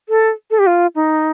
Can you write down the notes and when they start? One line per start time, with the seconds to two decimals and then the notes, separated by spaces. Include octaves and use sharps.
0.09 A4
0.51 A4
0.59 G4
0.67 F4
0.95 D#4